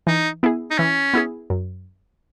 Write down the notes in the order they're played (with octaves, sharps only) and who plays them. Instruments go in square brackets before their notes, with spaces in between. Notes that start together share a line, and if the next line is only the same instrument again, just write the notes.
[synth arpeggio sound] E3 [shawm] D#4
[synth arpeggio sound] B3 E4 G#4
[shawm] D#4
[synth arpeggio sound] E3 [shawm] C#4
[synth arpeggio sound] B3 E4 G#4
F#2